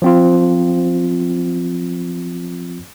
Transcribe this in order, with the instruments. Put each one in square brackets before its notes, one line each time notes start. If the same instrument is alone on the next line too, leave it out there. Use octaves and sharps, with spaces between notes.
[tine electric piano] F3 C4 F4